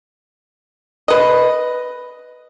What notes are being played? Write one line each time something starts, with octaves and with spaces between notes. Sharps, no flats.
B4 D#5